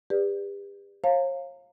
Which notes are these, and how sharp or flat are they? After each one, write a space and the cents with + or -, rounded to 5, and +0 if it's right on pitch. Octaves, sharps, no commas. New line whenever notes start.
G4 +35 B4 +0 D5 +0
C#5 -40 F5 +0 A#5 -35